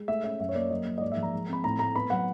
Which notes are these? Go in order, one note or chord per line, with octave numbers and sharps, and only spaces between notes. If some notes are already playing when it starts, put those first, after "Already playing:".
Already playing: G#3
A3 E5
C#4 E5
F#2 E5
C#5
A#3 D5
F#3 D#5
A#3
D#5
G#2 D5
E5
F3
A#5
G#3
C4 B5
A2 A#5
A3 A#5
B3 B5
F#3 F#5